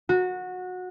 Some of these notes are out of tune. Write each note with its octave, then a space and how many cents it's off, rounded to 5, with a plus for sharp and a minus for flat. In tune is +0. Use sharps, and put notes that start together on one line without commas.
F#4 -20